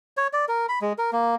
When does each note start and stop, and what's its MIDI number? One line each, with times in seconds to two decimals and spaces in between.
0.17 0.27 73
0.33 0.45 74
0.48 0.66 70
0.69 0.79 83
0.81 0.93 56
0.98 1.11 70
1.12 1.35 58